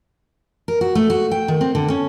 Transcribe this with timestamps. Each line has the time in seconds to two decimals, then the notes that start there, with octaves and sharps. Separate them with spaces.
0.68 A#4
0.81 F#4
0.95 A3
1.10 F#4
1.31 G5
1.48 D#3
1.61 C4
1.75 D3
1.90 C#4